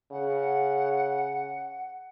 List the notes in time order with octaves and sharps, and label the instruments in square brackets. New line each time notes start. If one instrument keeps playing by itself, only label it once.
[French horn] C#3 [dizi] F#5